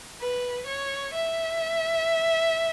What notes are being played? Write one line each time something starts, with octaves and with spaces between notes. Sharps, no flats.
B4
C#5
E5